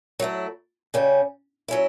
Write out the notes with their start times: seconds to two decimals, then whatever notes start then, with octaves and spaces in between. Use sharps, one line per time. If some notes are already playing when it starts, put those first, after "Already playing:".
0.19 F#3 A3 E4
0.94 C#3 G3 C#4
1.68 F#3 C#4 E4